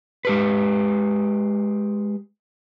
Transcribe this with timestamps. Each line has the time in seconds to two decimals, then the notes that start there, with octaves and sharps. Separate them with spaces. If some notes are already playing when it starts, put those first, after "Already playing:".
0.25 G#3 G4 B4